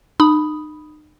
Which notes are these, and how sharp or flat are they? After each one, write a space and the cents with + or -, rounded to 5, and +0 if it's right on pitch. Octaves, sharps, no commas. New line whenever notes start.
D#4 -40 B5 +0 D#6 +0